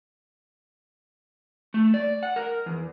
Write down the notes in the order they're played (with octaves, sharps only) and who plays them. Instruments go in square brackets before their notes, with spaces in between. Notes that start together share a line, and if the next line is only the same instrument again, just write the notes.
[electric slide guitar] A3
D5
F#5
A#4
E2